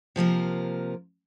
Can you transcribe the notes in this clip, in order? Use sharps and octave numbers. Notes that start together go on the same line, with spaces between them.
C3 F3 A#3 A#4